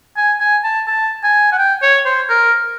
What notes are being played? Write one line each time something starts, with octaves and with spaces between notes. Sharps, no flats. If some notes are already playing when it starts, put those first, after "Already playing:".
G#5
G#5
A5
A5
G#5
F#5
G5
C#5
C5
A#4